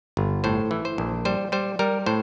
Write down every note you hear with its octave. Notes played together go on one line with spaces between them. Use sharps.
G1
A2 C5
E3
C5
A#1
G3 C5
G3 C5
G3 A#4
A2 C5